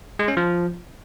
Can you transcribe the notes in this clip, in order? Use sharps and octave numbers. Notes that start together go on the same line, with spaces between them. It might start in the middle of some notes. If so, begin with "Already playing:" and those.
G#3
C#4
F3